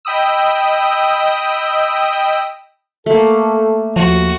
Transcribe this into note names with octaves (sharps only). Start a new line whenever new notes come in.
D#5 G5 B5 D#6 E6
A3 A#3 A4
D#2 F3 F#4